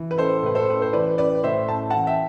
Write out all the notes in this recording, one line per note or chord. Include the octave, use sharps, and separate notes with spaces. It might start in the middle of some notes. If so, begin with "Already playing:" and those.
Already playing: E3
B4
A1 A4 C5
A2 B4
A4 C5
A1 B4
C5
E3 B4 D5
A1 B4 D5
A2 C5 E5
A1 A5
E3 F#5 A5
E5 G5